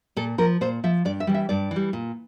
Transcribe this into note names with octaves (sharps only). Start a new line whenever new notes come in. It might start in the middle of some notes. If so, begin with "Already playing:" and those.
A#2 A4
F3 A#4
A#2 C5
F3 E5
G2 D5
E5
E3 G3
E5
G2 D5
E3
G3
A#2